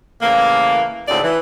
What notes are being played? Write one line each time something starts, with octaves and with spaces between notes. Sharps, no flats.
A2 C#3 E3 A#3
D2 G#2 C#3 E3 C4 D5
E3